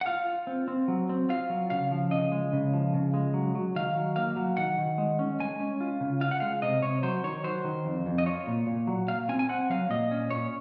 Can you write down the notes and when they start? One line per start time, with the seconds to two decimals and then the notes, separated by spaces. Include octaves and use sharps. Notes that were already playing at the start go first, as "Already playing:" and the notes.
0.01 F#5
0.06 F4 F5
0.27 F4
0.47 C4
0.68 C4
0.88 F#3
1.09 C4
1.29 F4 F5
1.50 F#3
1.70 C#3 F5
1.91 F3
2.11 C#3 D#5
2.32 G#3
2.53 C#3
2.74 F3
2.94 C#3
3.14 G#3
3.34 F#3
3.55 F#3
3.76 D#3 F5
3.95 F#3
4.16 A#3 F5
4.36 F#3
4.57 D#3 F#5
4.78 D#3
4.98 G#3
5.19 C#4
5.40 G#3 G#5
5.60 C#4
5.81 F4
6.01 C#3
6.21 F4 F5
6.31 F#5
6.40 G#3 F5
6.62 C3 D#5
6.82 C3 C#5
7.03 F#3 C5
7.24 D#3 C#5
7.44 F#3 C5
7.65 D#3
7.85 F2
8.06 F2
8.18 D#5
8.26 F4 C#5
8.47 A#2
8.67 A#2
8.87 F#3
9.08 A#2 F5
9.29 C4 G#5
9.39 G#5
9.49 C4 F#5
9.70 F#3 F5
9.90 A#2 D#5
10.11 C#4
10.31 A#2 C#5